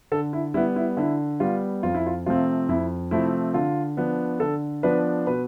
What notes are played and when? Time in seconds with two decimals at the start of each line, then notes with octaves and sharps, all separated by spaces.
0.12 D3 A4
0.33 E4
0.54 G3 B3 E4
0.76 E4
0.97 D3 E4
1.40 G3 B3 F4
1.83 F2 F4
1.95 E4
2.07 F4
2.26 C3 F3 A3 C4 F4
2.69 F2 E4
3.11 C3 F3 A3 C4 E4
3.54 D3 F4
3.97 F3 B3 D4
4.40 D3 A4
4.83 F3 B3 D4 B4
5.27 B2 B4